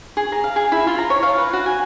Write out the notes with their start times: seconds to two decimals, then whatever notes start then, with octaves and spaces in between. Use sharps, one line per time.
0.17 G#4
0.32 A#5
0.44 F5
0.56 G#4
0.72 E4
0.87 F4
0.98 A#5
1.10 C#5
1.23 F5
1.38 B4
1.53 F#4
1.66 G#5